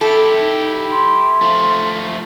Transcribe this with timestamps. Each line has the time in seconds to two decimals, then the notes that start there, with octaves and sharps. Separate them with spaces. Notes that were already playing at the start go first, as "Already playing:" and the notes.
0.01 E4 G4 A4
0.40 D#4
0.91 C6
1.41 F3 A3